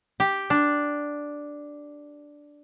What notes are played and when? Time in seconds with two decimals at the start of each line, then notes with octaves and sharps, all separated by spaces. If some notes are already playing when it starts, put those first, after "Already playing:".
0.20 G4
0.50 D4